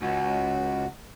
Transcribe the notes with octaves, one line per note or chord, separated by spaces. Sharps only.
C#2 F#4